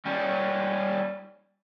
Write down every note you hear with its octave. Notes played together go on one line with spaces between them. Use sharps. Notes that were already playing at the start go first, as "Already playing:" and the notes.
G3 C#4